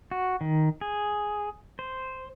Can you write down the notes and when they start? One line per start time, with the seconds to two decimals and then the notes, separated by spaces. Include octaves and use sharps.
0.11 F#4
0.41 D#3
0.81 G#4
1.79 C5